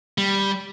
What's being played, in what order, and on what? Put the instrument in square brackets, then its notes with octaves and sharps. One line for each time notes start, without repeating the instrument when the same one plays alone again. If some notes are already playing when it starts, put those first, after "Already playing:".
[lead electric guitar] G3